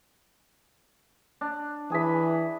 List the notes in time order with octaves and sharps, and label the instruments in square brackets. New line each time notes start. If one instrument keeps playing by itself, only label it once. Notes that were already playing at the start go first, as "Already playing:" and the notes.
[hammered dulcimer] D4
[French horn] E3 [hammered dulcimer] G#4 B5